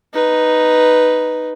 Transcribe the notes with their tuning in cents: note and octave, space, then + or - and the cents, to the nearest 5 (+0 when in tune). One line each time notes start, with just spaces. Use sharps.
D#4 +0 B4 +0